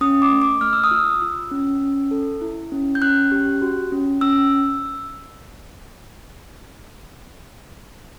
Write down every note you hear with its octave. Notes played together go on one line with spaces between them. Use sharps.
C#4 D#6
D6
A3
D6
A3 F6
E6
D#6
F4 E6
F4
C#4
C#4
A4
E4
C#4
G6
C#4 F#6
G4
F#4
C#4
C#4 E6